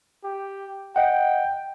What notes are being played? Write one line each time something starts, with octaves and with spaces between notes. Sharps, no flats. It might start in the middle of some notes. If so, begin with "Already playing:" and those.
G4
D#5 F#5 G5